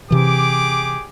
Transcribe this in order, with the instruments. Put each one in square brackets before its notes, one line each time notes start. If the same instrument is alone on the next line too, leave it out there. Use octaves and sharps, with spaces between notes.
[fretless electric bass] C3 E3 [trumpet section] G4 G#4 D6